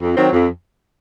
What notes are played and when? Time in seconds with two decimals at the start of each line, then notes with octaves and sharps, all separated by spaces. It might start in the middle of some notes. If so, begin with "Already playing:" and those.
0.01 F2
0.17 D#3 F#3 C4
0.32 F2